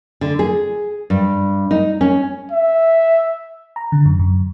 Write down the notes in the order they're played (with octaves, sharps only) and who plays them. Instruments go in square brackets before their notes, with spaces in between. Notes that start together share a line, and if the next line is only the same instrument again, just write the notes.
[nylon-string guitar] D3
G#4
G2
D#4
C#4
[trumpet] E5
[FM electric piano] A#5
D3
F#2
F#2